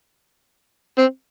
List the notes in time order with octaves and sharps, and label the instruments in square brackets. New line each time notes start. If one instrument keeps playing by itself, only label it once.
[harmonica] C4